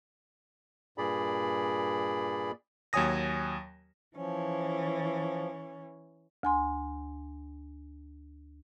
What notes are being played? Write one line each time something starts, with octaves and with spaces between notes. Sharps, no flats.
G2 A#2 G#4 D5 B5
D#2 F#3 C#5 G#5 D#6 A#6
E3 F3 C#4
D2 G#5 C6